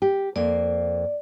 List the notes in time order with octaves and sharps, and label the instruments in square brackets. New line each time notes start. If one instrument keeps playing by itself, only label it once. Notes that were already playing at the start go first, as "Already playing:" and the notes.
[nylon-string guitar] G4
[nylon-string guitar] F2 A#3 [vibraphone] D5